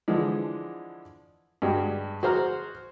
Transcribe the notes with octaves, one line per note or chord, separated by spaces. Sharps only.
D3 E3 F3 G#3
G2 G#3 F#4 G4
F#4 G#4 C5 A#5 F6